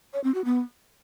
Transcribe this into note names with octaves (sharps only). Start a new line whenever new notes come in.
C#5
C4
F#4
B3